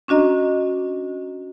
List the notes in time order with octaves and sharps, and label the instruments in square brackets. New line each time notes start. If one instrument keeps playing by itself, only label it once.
[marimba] C#4 D4 F#4 D#5 A#5